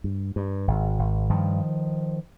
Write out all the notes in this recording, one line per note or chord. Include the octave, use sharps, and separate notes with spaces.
G2
G2
G#1
G#1
G2 D#3 F3